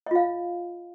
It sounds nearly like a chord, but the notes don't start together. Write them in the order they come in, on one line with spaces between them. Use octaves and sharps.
D#5 F4 F5